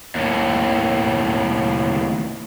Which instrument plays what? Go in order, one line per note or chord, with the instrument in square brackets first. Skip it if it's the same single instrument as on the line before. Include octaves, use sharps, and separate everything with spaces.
[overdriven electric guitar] D#2 A2